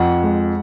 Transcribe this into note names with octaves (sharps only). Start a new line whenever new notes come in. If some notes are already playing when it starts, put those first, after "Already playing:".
Already playing: F2 F#5
G#3